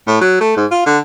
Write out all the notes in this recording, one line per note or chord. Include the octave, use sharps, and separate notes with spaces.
A2
F#3
A3
G#2
F4
D3